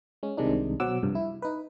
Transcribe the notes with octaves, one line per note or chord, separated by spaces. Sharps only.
G#3 C#4
C2 C3 D#3 G#3 D4 D#4
B2 F#3 C5 F#5 D6 E6
C2 G2 F3
E4
D#4 B4